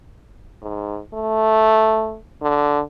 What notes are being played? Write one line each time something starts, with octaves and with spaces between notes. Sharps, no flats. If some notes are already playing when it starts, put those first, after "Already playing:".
G#2
A3
D3